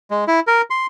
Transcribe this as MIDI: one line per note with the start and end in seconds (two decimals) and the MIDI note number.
0.11 0.24 56
0.27 0.40 64
0.47 0.62 70
0.70 0.87 84